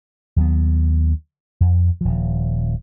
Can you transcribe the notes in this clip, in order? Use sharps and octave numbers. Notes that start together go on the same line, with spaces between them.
D#2 F#3 B3
F2
D#1 F3